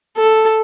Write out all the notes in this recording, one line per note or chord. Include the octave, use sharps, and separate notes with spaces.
A4